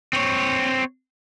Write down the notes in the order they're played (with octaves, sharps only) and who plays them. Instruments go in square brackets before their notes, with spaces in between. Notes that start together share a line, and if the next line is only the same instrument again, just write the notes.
[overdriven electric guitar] C4 C#5